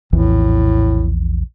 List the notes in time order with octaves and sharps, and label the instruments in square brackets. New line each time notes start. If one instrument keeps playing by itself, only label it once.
[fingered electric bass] A#1 E2 E3 [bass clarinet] A2